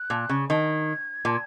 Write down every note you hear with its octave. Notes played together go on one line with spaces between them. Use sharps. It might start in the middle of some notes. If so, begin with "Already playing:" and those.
Already playing: F#6
A#2
C#3
D#3 G#6
A#2